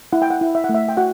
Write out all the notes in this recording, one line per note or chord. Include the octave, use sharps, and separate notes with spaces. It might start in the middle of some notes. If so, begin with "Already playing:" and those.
E4 F#5
G5
F#5
E4
E5
F#5
A3
E5
G5
F#4 F#5